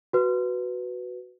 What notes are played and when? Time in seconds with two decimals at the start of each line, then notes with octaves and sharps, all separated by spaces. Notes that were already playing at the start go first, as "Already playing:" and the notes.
0.13 F#4 B4